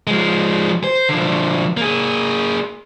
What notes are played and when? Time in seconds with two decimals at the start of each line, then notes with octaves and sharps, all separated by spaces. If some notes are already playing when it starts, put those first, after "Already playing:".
0.07 F3 G#3
0.84 C5
1.09 D3 F3
1.77 A#3 G#4